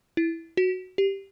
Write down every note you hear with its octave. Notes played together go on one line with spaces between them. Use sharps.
E4
F#4
G4